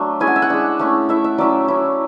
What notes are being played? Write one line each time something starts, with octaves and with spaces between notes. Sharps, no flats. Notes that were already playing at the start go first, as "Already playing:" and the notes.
Already playing: F#3 A3 D4 E5
G#3 C#4 E4 G#5
F#5
E5
F#5
G#3 D4
A3 C#4 E4
A3 E4 E5
E5
F#3 C#4 E4 D5
F#3 C#4 E4